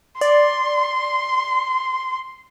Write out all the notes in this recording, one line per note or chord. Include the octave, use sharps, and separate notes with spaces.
D5 C6